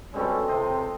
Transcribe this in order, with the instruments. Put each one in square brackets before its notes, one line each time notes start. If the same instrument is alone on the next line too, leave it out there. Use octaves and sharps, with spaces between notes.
[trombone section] B2 G3 C#4 [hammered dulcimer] G#3 C4 A4
[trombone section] C#2 C3 [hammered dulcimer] C5 D#5